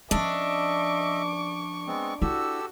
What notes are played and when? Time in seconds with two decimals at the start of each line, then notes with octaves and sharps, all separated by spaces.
0.11 F3 C#4 D4 D#5 E5 C#6 D6
1.87 G#3 B3 C4
2.22 E4 F#4 G4 A4 E6